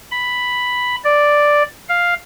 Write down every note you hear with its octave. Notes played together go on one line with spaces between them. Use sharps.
B5
D5
F5